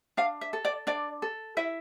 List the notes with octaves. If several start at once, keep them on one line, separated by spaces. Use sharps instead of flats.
D4 F5
E5
A4
D5
D4 D5
A4
E4 E5